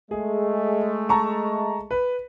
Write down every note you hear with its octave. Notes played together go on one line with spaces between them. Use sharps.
G#3 A3 G#4
A5 A#5 C#6
B4